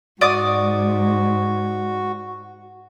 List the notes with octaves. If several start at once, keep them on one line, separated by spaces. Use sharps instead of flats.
G#2 F#4 D5 D6 D#6